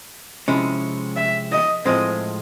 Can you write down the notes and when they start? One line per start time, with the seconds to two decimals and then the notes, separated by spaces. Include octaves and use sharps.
0.48 C3 F3 G#3 C#4 E4
1.16 E5
1.52 D#5
1.86 A2 F3 G#3 C4 D#5